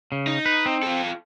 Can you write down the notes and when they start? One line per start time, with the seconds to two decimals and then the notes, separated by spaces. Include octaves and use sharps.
0.12 C#3
0.27 D#4
0.46 B4
0.66 C4
0.83 F4 A4